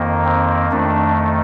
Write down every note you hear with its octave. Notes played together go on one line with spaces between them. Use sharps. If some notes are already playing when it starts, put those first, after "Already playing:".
Already playing: F2 D#3 A#3
C4
F2 D#3 A3 D4